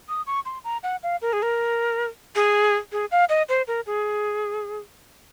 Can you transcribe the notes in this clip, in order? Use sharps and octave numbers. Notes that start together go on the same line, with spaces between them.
D#6
C#6
C6
A#5
F#5
F5
A#4
G#4
A#4
G#4
G#4
F5
D#5
C5
A#4
G#4